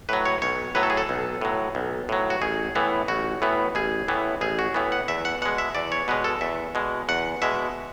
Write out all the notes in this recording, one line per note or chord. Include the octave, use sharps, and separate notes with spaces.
A2 F#3 B4
C#5
B1 C#5
A2 F#3 B4
A4
G#4
A4
B1
A2 F#3
B1
A2 F#3
F#4
A1 G#4
A2 E3 B3
A1 F#4
A2 E3 B3
A1 G#4
A2 E3 B3
A1 G#4
F#4
A2 E3 B3
F#5
E2 E5
F#5
B2 G#3 F#5
E5
E2 D5
C#5
B2 G#3 B4
A4
E2 E5
B2 G#3
E2 F#5
B2 G#3 E5